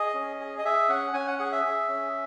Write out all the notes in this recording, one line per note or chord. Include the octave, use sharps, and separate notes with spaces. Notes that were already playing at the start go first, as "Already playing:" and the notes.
Already playing: G#4 D#5
C#4
G#4
D#5
G#4 E5
C#4 F#5
C#4 G#5
F#5
G#4 F#5
E5
G#4
C#4